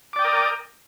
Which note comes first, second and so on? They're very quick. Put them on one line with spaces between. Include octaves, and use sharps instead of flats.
D6 D5 G5 D#6 A#4